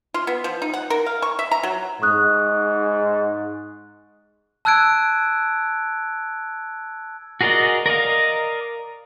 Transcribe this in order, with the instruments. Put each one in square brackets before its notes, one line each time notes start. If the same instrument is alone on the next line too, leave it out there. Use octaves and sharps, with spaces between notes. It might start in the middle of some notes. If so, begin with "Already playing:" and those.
[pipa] F4
B3
F3
D#4
F#5
A#4
F5
C#6
E5
A#5
F#3
[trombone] G#2 [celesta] C#6 D#6 F#6
[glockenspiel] A5 E6 F#6 G#6 D7
[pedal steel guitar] F#4 G#4 A#4 D5 D#5
A#4 D5 D#5 F5